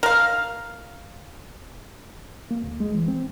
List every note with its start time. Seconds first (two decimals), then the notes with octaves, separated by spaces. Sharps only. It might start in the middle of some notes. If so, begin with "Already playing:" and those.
0.03 A#4 F5
2.51 A#3
2.64 D2
2.80 G#3
2.95 E3
3.08 C4